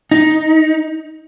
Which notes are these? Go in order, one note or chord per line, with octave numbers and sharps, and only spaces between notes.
D#4